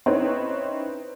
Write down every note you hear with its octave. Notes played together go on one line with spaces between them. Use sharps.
C4 C#4 D#4 E4 B4 C#5